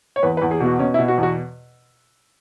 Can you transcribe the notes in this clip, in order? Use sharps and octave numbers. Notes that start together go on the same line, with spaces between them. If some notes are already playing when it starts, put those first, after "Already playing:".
C#5
E2 B4
B4
E2
G#4
B2
F#4
B2 C#4
E4
B2
F#4
E2
F#4